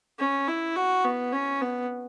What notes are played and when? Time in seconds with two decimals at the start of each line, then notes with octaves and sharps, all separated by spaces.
0.19 C#4
0.48 E4
0.76 F#4
1.04 B3
1.32 C#4
1.61 B3